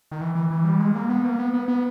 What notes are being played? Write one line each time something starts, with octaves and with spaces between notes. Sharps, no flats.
D#3
E3
E3
E3
G3
G#3
A#3
B3
A#3
B3
B3
B3